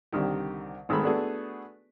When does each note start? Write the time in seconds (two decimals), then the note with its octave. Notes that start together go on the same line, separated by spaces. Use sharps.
0.12 C2 D3 D#3 G4
0.89 G#1 D#3 G#3 A3 B5
1.03 A3 B3 D4 F#4 G#4 A4